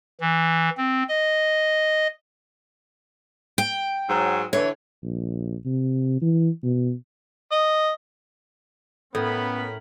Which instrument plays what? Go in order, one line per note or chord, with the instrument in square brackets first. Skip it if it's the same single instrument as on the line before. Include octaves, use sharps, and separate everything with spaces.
[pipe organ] E3
C4
D#5
[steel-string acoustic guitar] G5
[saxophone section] G#2 F#3
[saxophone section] D3 E3 [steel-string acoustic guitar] C#5
[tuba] A#1
C3
E3
B2
[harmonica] D#5
[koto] A2 [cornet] B3 [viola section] C#4 A#4 B5 [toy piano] A4